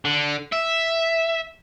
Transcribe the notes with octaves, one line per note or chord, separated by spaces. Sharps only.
D3
E5